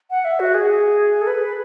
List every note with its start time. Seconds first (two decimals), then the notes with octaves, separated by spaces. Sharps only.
0.11 F#5
0.25 E5
0.40 F#4
0.54 G#4
1.22 A4
1.27 B4